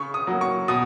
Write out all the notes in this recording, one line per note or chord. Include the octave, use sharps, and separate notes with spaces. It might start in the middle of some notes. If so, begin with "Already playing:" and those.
Already playing: C#3 C#6
D#6
F#3 A#3
C#6
B2 D#6